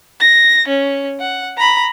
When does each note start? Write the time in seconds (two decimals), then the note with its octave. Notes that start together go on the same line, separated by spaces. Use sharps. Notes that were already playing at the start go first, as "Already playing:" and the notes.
0.20 A#6
0.68 C#4
1.20 F#5
1.57 A#5 B5